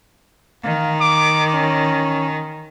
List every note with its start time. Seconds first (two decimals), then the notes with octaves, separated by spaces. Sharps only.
0.64 D#3 F5
1.01 D6
1.54 C#4